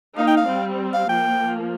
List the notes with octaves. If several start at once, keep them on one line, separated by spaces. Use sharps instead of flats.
A#3 D#4 F5
G5
F5
G3 C4
F5
F3 A#3 G5